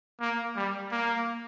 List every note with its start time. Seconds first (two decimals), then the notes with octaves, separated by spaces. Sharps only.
0.21 A#3
0.56 G3
0.92 A#3